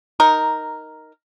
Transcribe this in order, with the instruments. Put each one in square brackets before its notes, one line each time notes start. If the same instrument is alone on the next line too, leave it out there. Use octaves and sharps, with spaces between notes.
[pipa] D#4 A#4